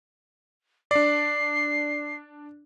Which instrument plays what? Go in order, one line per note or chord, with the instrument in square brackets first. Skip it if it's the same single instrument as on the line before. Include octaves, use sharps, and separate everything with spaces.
[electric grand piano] D4 D5 [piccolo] C7